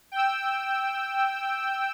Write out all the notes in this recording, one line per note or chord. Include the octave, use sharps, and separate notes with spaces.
G5 E6